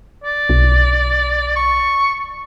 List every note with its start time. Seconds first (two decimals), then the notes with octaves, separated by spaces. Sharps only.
0.24 D5
0.49 B1
1.56 C#6